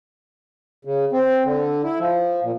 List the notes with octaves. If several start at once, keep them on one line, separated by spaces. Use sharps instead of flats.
C#3
C4
D3
E4
F3
A#2